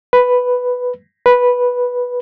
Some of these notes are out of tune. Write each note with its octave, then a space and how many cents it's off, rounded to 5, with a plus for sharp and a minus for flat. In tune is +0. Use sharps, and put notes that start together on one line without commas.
B4 +0
B4 -10